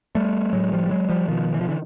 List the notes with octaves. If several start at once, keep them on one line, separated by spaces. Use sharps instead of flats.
G3 A3
A2 F#3 G#3
F3 G3
G3
F#3 G#3
F3 G3
B2 D#3 F3
E3
F3
D3 E3